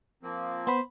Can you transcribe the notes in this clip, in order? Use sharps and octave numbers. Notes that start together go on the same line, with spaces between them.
F3 A#3 C4
B3 C5 B5